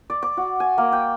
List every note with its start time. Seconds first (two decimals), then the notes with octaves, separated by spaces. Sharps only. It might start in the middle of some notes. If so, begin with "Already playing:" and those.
0.10 D5
0.23 D6
0.37 F#4
0.60 G#5
0.78 A#3
0.93 G5